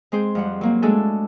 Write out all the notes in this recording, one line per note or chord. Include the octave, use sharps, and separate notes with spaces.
G#3 C4 G#4 C5
F2 G3 F#5
F#3 A#3 C4
G#3 A3 D4 F#4 G#4 A4